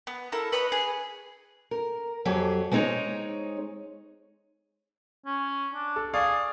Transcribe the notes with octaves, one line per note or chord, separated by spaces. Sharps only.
B3
E4 A4 A#4
B4 C#5 D#5 B5
G#4 B4
A#4
F2 F#3 G4 G#4 C#5
G#3 B3 C4 D#4 G#4 C#5
C#4
D4
A4
G#4 D5 F5 C#6